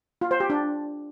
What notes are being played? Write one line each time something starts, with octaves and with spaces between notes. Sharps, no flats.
F4
C5
G4
D4